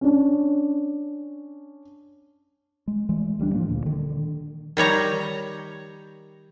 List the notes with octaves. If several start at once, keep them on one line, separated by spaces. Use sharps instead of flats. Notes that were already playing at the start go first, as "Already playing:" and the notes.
C#4 D4
G#3
E3 G#3 A3
D2 G3 B3 D4
A2 F3 A#3
D2 A#2
D3 D#3
D#3 G3 C#5 A#5